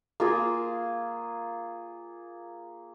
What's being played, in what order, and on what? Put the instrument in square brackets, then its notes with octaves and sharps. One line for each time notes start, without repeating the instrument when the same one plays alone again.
[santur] A#3 F4 G#4